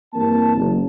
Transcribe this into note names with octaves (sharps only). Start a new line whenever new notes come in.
G2 E3 A#3 C4 A#4 A5
F#1